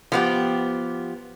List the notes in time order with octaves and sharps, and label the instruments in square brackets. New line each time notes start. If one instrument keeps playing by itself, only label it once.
[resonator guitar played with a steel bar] F3 B3 G4